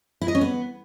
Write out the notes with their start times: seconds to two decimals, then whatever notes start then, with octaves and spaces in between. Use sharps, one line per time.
0.22 E4
0.28 D#5
0.35 C#4
0.41 B3